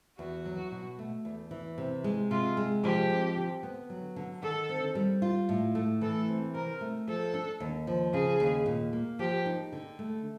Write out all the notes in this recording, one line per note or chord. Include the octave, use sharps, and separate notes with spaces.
E2 F#4
F#3
B2
A3
E2
E3
C3
G#3
C3 F4
G#3
F3 G4
C4
D3
B3
F#3
D3
D#3 A4
C4
G3
F4
A2
A3
E3 A4
C4
C3 A#4
A3
F3 A4
D4
D#2
F3
C#3 G#4
D#2
A#2
A#3
F3 G4
D#4
D3
A3